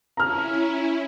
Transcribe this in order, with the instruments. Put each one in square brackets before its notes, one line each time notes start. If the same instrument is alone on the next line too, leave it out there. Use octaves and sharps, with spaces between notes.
[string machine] C#4 E4 [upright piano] A#5 F6